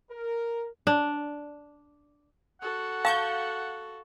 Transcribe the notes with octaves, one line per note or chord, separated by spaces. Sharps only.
A#4
D4
F#4 A4 F#5
F5 A5 C#6 G6